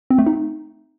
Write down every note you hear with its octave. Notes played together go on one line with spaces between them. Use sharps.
C4
A3
D#4